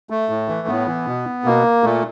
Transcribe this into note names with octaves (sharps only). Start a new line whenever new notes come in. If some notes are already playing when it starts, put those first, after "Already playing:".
A3
A2
E3
A2 B3
E3
B2
B2 A#3
A#2 A3